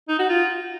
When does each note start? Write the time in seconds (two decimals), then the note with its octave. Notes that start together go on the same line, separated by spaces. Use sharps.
0.08 D#4
0.19 F#4
0.29 F4